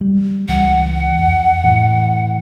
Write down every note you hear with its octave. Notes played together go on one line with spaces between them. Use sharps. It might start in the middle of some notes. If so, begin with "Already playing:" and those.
G3
C#2 E3 F#5
F2
A2 E3